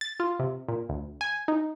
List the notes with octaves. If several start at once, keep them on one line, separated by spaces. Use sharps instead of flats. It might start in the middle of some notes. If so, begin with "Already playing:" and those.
A6
F4
C3
A#2
D2
G#5
D#4